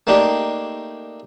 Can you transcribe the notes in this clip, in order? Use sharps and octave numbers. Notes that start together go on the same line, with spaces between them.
A3 A#3 D4 D#4 G4